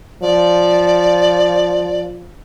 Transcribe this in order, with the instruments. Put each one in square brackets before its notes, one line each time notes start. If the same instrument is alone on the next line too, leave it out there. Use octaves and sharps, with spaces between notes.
[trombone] F3 [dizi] D5